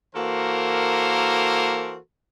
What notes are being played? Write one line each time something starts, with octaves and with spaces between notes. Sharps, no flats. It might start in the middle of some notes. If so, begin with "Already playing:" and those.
E3 A#3 F#4 A4 A#4 C5